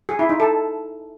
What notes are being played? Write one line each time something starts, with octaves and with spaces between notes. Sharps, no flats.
G#4
E4
D#4
A4